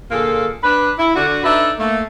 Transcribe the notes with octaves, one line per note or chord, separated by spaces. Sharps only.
A#2 D3 A#3 F4 G#4 A4
D4 B4
E4
D3 F#4
D4 D#4 A4 B4 E5
A3 A#3